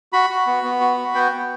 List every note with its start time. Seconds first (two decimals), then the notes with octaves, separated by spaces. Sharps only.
0.13 F#4 B5
0.30 F#4
0.47 B3
0.63 B3
0.80 F#4
0.97 F#4
1.15 B3 G5
1.31 B3